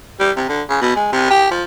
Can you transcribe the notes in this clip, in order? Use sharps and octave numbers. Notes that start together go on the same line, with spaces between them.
G3
C3
D3
C#3
B2
G#3
C3
G4
F3